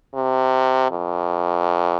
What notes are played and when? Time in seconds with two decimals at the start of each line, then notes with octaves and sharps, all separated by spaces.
0.15 C3
0.91 F2